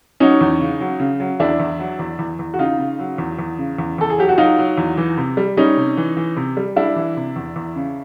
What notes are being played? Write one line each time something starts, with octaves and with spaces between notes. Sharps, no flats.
F#3 C#4 D#4
E2
C#3
F#3
C#3
F#3
E2 D4 E4
E2
F#3
E2
E2
E2
F#4
C#3 D#4 F4
C#3
F#3
E2
E2
C#3
E2
E2 A4
G#4
F#3 G4
F#4
F#3 D#4 F4
F#3
E2
E3
C3
G3
G3 C#4 D#4
C3
E3
E3
C3
G3
G3 D4 E4
E3
C3
E2
E2
C#3